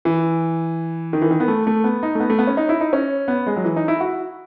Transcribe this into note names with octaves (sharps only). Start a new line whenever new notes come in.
E3
D#3
E3
D#3
B3
A3
A3
B3
D#4
A3
B3
A3
B3
C#4
D#4
E4
D#4
C#4
B3
G#3
F#3
E3
D#4
E4
F#4